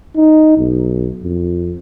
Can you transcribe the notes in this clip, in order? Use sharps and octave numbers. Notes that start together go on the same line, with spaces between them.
D#4
B1
F2